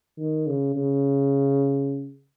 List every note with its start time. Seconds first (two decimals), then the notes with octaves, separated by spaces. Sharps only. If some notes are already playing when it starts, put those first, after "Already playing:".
0.18 D#3
0.47 C#3
0.76 C#3